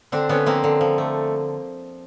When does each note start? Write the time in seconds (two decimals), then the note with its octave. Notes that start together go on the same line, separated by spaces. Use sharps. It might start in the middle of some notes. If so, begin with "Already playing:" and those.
0.12 D3 C4 D4
0.29 D3 B3 C#4
0.46 F3 A#3 C4
0.64 D3
0.81 F3
0.98 A3